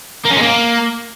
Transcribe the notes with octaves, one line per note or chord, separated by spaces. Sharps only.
A#3
C#4
G#3
A#3